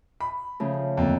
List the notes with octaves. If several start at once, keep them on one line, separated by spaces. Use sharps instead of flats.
B5
C#3 F3 A3
F2 D3 A#3 A5